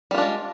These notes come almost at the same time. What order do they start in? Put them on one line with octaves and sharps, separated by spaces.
G3 F4 D4 G#3